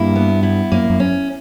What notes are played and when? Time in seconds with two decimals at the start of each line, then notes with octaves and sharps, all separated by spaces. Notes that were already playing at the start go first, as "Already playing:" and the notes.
Already playing: G2 A#3 E4
0.15 B3
0.43 E4
0.72 F#2 A#3
0.90 F#2
1.00 C#4